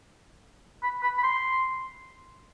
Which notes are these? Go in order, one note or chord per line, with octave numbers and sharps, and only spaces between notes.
B5
B5
B5
C6